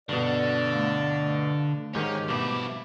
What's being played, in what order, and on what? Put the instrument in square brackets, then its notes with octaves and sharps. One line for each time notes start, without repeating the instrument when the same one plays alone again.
[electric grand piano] G2 B2 [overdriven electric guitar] D3 [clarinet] D5
[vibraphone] A3 F5
[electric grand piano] G#2 D#3 [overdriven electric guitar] C#4 [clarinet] G4
[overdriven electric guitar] G2 E4 [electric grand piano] B2 D6